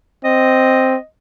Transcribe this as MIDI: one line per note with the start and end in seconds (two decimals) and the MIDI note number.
0.25 0.97 60
0.25 1.05 75